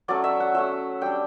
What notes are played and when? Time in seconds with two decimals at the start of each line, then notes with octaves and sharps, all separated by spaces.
0.08 F#3 A3 C#4 D5
0.24 E5
0.40 F#5
0.54 F#3 A3 C#4 E5
1.01 G3 D4 G5